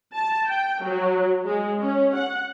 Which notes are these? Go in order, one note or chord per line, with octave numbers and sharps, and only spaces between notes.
A5
G5
F#3
G#3
C#4
F#5